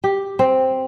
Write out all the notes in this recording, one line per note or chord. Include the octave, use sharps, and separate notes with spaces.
G4
C4